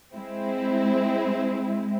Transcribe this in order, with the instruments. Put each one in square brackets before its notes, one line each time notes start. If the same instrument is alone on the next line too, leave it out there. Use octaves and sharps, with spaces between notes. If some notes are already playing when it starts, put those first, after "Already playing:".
[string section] G#3 C4 E4